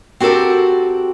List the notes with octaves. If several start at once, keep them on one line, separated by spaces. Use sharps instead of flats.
C4 F#4 G4 A4 A#4